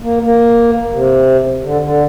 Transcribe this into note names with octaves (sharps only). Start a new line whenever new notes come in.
A#3
A#3
C3
D3
D3